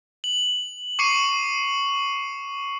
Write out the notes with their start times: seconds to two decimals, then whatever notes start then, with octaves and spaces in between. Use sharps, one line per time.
0.24 F#7
0.99 C#6 D6 C7 C#7 D#7 F#7